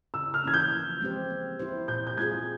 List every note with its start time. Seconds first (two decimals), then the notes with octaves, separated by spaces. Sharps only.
0.14 C#3 E6
0.34 F6
0.44 E3 A#3 C#4 G#6
0.54 G6
0.72 F3
1.01 G#3 C4 G4 C5
1.30 A#3
1.59 E4 G4 C5
1.88 A#2 G6
2.07 G6
2.17 G#3 C4 F4 G#4 G#6